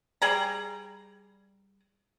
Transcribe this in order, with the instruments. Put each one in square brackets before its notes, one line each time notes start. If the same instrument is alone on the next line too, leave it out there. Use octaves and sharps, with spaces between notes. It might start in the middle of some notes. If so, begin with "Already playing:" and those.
[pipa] G3 G#4 A#5